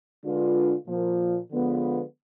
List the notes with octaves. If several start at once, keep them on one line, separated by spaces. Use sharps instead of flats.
D3 G#3 D4 F4 B4
A#2 F3 A#3
D3 F3 G#3 B3 F4